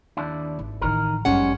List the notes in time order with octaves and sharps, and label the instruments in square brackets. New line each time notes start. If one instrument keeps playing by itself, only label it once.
[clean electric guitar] D#2 D4 E4
[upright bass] G#1
[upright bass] A1 E3 [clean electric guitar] D#3 A#4
[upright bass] G1 F#2 [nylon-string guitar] G3 C#4 F#5 [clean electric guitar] G#3